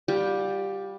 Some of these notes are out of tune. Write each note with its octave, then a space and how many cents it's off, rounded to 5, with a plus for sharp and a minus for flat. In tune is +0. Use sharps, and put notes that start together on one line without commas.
G3 +0 F4 +35